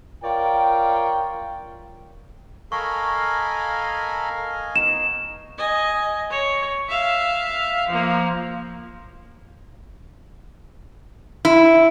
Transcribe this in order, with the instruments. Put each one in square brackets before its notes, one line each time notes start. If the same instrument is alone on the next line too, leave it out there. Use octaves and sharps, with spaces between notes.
[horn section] F4 A#4 C#5 D5 F5 G5
[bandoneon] A4 A#4 B5 [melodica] D#5 F5 G#5 [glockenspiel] C#6
[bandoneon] B3 D#4 [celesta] E7
[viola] D#5 G#5
C#5
E5 F5
F3 A#3
[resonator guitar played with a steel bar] E4